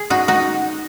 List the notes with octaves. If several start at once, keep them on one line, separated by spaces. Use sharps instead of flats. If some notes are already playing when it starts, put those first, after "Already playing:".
Already playing: G#4
D#4 F#4
D#4 F#4